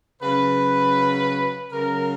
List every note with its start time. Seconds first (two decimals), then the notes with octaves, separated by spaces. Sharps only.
0.22 C#3 F#3 B4
1.72 C#3 F#3 A#4